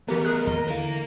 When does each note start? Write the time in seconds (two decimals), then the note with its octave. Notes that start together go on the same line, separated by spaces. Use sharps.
0.08 A2 E3 B3 G4 A#4 B4
0.25 G#4 F#6
0.47 D#2 A#2 D#5
0.68 D3 E3 A#4 F5